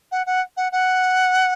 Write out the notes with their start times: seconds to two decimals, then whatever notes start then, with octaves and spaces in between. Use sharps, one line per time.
0.11 F#5
0.26 F#5
0.57 F#5
0.72 F#5